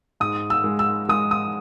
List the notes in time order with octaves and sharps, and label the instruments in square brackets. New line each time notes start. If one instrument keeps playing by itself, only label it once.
[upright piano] G#2 D#6
E6
G#3
E6
G#3 D#6
D#6